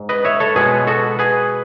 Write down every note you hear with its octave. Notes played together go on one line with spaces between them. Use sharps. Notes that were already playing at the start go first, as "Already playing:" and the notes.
Already playing: G#2
B4 D#5
C#5 E5
A4 C#5
B2 G#3 B3 G#4 B4
F#4 A4
G#4 B4